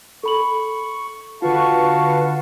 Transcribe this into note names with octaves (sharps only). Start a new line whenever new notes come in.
A4 B5 C#6 F#7
D3 F4 F#4 B4 F5 A5 C#6